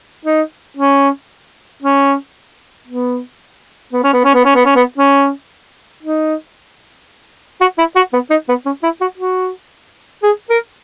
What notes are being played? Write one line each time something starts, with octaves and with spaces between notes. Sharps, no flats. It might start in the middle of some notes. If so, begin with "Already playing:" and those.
D#4
C#4
C#4
B3
B3
C#4
B3
C#4
B3
C#4
B3
C#4
B3
C#4
D#4
F#4
E4
F#4
B3
D#4
B3
C#4
E4
F#4
F#4
G#4
A#4